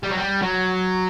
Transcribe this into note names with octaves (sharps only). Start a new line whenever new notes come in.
G3
F#3
G3
F#3